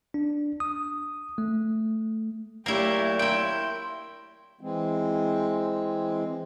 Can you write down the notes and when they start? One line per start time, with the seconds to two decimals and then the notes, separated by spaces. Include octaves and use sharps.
0.14 D4
0.60 D#6
1.38 A3
2.66 A#2 F#3 A3 A#3 E4 G4
3.19 E4 G5 C6
4.61 E3 G#3 C4